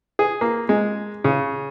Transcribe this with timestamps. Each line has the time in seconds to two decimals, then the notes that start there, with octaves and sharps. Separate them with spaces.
0.19 G#4
0.41 A#3
0.69 G#3
1.24 C#3